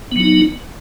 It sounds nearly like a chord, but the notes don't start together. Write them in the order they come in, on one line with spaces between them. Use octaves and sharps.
B3 F#3 D#4